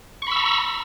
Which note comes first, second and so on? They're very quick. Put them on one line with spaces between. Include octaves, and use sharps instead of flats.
C#6 B5 E6 A#5